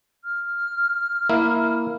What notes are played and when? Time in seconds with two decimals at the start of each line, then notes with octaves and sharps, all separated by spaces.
0.24 F6
1.30 A#3 E4 E5